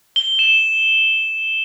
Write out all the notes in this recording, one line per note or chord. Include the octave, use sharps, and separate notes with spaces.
G7
E7